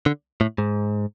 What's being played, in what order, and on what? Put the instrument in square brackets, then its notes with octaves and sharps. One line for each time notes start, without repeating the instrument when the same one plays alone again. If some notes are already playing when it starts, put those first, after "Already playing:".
[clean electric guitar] D3
A2
G#2